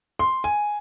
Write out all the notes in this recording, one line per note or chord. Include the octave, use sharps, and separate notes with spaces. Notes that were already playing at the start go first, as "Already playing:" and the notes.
C6
G#5